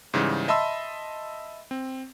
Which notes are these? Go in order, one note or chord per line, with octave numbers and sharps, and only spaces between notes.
G#2 C#3 E3 G3
D#5 E5 A5 B5 C6 E6
C4